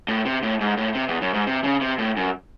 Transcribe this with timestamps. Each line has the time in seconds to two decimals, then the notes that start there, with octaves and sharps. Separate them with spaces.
0.08 A2
0.25 C3
0.43 A2
0.61 G#2
0.77 A2
0.95 C3
1.08 E2
1.22 F#2
1.34 G#2
1.47 C3
1.64 C#3
1.81 C3
1.98 A2
2.17 F#2